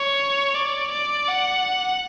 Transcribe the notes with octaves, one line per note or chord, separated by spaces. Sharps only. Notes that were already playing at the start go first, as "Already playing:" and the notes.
Already playing: C#5
D5
D5
F#5